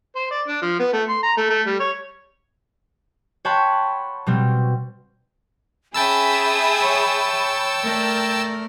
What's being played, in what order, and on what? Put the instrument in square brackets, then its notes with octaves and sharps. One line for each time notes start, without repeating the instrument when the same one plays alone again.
[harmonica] C5
D5
D4
F3
B3
A3
C6
A#5
A3
A3
G3
C#5
[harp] C#5 F#5 G5 A5 B5 C6
B2 G3 C4
[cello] C#4 [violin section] G#4 E5 D#6 [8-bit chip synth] G5 A5 E6 [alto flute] B5
[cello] C#5
[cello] A3 A#4 [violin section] D5